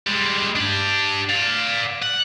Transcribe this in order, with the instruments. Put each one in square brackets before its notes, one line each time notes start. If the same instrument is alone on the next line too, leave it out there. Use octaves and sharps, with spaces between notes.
[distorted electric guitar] G3 G#3
D4 G4
D5 F5
F#5